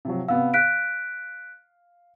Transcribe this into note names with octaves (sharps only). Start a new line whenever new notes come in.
C3 F3 F#3
C3 B3 F5 E6
F5 F#6 B6 D7